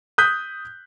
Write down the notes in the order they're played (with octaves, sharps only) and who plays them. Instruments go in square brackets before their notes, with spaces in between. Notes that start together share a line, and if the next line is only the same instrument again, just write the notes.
[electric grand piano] D#6 F#6 G6 B6